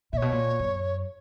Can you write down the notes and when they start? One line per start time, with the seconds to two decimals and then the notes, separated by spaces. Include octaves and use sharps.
0.13 A#2 E5
0.17 B2 C#5
0.32 A#2
0.59 F#2